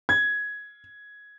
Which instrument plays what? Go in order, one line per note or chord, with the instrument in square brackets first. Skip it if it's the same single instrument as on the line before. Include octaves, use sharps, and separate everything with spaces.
[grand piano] G#6